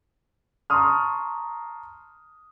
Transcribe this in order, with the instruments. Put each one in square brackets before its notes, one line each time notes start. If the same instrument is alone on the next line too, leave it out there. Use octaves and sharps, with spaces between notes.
[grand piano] A5 A#5 C6 C#6 D#6 F6